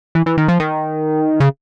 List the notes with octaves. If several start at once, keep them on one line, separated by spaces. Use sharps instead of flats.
E3
E3
D#3
F3
D#3
C#3